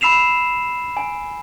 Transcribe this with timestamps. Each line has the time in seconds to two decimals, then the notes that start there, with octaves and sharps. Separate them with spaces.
0.01 B5 E6 C7 E7 F7
0.97 G#5